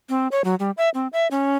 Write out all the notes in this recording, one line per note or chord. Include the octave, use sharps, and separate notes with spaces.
C4
C#5
F#3
G3
E5
C4
E5
C#4